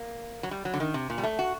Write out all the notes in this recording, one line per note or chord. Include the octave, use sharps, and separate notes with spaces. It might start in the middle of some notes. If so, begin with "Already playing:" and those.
Already playing: A#3
F#3
G3
F#3
D3
D#3
C3
A#2
G3
A3
F#4